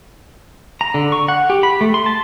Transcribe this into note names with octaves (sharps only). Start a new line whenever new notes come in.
A#5
D3
C#6
F#5
G4
B5
A3
C6
A5